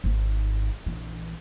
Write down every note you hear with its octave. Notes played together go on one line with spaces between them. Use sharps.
G#1 D#4
A#1 E3